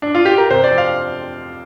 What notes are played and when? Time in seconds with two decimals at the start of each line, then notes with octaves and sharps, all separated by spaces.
0.02 D4
0.15 F4
0.25 G4
0.38 A#4
0.50 C3 C5
0.64 D5
0.71 F2
0.78 F5